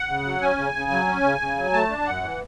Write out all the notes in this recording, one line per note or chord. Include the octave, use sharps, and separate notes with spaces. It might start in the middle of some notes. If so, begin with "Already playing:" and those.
Already playing: F#5
C#3
F#3
C#4 G#5
C#3
C#3
F#3
C#4
C#3
C#3
F#3
A3 A5
D4
F#2 F#5
E3